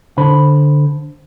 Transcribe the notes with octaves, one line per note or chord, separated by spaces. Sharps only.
D3 C5 B5